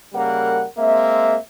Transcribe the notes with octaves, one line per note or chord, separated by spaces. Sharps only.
C#3 G3 A#3 A#4 F#5
G#3 A#3 C4 E5